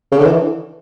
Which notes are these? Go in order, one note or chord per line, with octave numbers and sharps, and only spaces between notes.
C#3
D3
E3